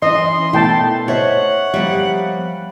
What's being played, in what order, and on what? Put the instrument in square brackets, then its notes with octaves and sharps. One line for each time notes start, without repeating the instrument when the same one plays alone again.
[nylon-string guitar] E3 C#4 E4 [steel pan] D#5 [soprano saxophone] C6
[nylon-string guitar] B2 A3 A#3 [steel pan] E4 G5 A5
[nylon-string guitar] C5 D#5 E5 [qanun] C#5 [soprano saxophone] F#5
[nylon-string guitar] F3 A#3 E5 [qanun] G3